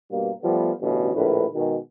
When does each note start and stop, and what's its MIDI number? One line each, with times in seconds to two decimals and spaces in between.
0.11 0.30 43
0.11 0.30 47
0.11 0.30 55
0.11 0.30 58
0.42 0.72 53
0.42 0.72 55
0.42 0.72 57
0.42 0.72 59
0.81 1.13 33
0.81 1.13 38
0.81 1.13 43
0.81 1.13 47
0.81 1.13 61
1.15 1.45 34
1.15 1.45 45
1.15 1.45 50
1.15 1.45 71
1.54 1.77 47
1.54 1.77 51
1.54 1.77 56